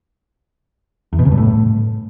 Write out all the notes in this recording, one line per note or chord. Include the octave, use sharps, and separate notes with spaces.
E2
B2
C#3
G2
A2